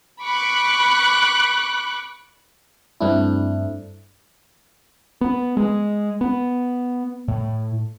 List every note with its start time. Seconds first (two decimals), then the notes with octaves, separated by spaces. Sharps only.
0.22 B5 C#6 D6 F#6
3.01 G2 A3 C4 D4 E4
5.21 B3
5.57 G#3
6.21 B3
7.28 A2